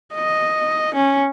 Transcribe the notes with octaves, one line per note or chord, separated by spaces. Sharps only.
D#5
C#4